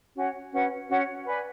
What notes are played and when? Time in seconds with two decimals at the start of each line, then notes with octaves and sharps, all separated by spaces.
0.16 C#4 F#4 C#5 G#5
0.52 C#4 F#4 B4 F#5
0.89 C#4 F#4 C#5 F#5
1.26 B4 D5 G#5 B5